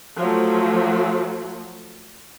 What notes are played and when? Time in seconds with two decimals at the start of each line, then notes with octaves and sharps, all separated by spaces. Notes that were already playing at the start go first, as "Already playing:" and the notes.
0.17 F3 F#3 A3